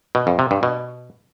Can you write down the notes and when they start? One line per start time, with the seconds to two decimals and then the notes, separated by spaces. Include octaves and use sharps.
0.15 B2
0.27 F2
0.39 C3
0.51 G2
0.63 B2